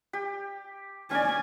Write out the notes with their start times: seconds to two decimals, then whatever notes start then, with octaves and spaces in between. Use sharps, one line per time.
0.13 G4
1.11 C#4 D5 G#5